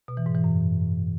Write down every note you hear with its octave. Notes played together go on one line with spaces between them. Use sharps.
B2
E3
G#2
E3
F#2